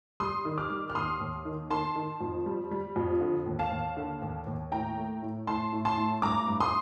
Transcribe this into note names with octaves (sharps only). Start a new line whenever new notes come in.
G3 C6 D#6
D#3
D6 F6
G3
F6
D#2 C6 D#6
D#2
D#3
D#3 A5 C6
D#3
F2
G3
G3
F2
D3
D#2
F5 A5
D#2
D3
D#2
D#2
A2 G5 A#5
A3
A2
A2 A5 C6
A2
A5 C6
A2
G2 A#5 D6
G2
C6 D#6